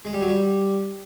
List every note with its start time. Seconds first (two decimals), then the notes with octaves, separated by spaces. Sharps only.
0.05 G#3
0.13 G3
0.21 F#3
0.28 G3